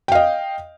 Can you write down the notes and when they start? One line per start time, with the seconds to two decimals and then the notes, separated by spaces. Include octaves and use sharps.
0.08 G5
0.12 F5
0.15 D#5